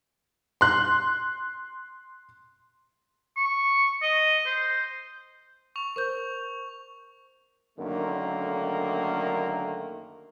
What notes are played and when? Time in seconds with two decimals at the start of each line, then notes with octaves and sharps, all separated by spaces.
0.61 C6 F#6
3.37 C#6
4.02 D#5
4.46 C5
5.76 C#6 F7
5.96 A#4 C5 C#6 G6
7.79 F#2 D3 D#3 A3 A#3